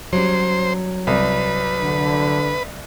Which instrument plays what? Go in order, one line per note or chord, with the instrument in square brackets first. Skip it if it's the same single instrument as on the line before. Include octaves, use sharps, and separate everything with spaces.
[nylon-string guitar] F#3 G3 C#4 [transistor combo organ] C5
[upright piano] C2 [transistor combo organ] B4
[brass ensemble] D3